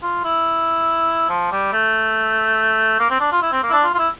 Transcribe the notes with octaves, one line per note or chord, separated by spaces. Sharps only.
F4
E4
F3
G3
A3
A#3
C4
D4
F4
E4
C4
A#3
E4
D4
F4
F4
E4